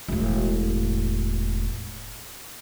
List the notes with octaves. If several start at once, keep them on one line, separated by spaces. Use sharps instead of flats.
E1 A2